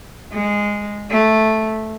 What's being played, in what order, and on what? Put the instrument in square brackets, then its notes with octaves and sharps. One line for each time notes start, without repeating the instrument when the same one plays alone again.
[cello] G#3
A3